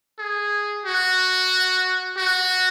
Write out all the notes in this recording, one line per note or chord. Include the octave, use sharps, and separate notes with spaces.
G#4
F#4
F#4